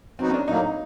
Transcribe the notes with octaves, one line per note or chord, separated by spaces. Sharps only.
F#3 B3 C4 D#4 F#4
C#4
D4
A2 F#3 A#3 D#4